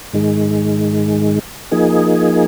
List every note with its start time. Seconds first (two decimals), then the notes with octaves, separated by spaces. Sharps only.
0.13 G#2 D#3 G#3
1.71 F3 A#3 D#4 G#4